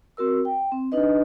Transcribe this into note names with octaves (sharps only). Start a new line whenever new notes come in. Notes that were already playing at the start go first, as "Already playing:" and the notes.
C4 F#4 A#4 E6
G5
C4
D4 D#4 B4 D#5